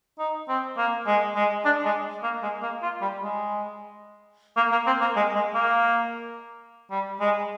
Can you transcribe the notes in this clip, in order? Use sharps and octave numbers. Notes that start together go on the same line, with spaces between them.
D#4
C4
A#3
G#3
G#3
D4
G#3
A#3
G#3
A#3
F4
G3
G#3
A#3
A#3
C4
A#3
G#3
G#3
A#3
G3
G#3